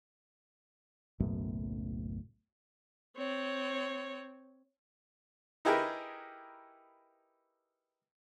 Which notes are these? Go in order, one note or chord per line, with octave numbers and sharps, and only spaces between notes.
F#1 B1 F#2 A2
C4 C#5
D#4 E4 G4 G#4 A#4 B4